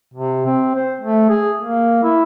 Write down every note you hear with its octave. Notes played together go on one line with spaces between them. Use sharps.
C3
C4
C5
A3
G#4
A#3
E4